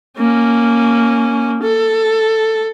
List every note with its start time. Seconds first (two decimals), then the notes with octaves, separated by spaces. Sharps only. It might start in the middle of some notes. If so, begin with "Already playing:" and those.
0.18 A#3 C#4
1.62 A4